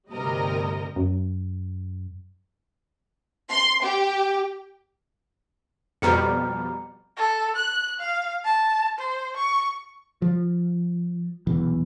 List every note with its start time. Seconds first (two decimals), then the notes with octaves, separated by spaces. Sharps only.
0.12 G1 D2 C3 G3 A#4 D#5
0.96 F#2
3.50 C6
3.84 G4
6.02 F2 B2 G3 A#5 F6 C#7
7.17 A4
7.56 F#6
7.99 F5
8.45 A5
8.98 C5
9.36 C#6
10.22 F3
11.47 D#1 B1 E2 E3